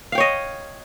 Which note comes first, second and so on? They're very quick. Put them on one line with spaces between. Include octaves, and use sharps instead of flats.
F5 G5 C#5 D#5